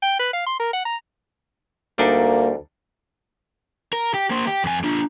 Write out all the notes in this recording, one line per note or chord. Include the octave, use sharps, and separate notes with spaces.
G5
B4
F5
C6
A#4
F#5
A#5
D2 G3 A#3 D4 D#4
A#4
G4
A#3 C5
G4
F2 G#5
D4 F4